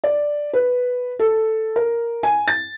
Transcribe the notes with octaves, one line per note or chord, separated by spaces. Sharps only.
D5
B4
A4
A#4
G#5
A6